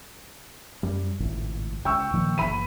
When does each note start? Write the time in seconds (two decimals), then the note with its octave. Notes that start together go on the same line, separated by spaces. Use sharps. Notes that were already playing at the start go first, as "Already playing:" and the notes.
0.83 F#2 G3
1.20 G#1 C#2 A2
1.85 C#2 G5 C#6 E6
2.14 A#2 D#3 F3
2.38 F#1 C#2 E3 B5 D#7